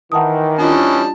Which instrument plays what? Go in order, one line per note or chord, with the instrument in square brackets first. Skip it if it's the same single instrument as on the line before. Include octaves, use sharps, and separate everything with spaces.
[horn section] D#3 [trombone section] E3 [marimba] F#5 A5 D#6
[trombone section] E3 C#4 [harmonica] G3 D#5 A5 [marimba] D4 F4